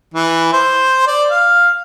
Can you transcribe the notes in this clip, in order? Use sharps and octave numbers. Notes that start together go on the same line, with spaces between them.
E3
C5
D5
F5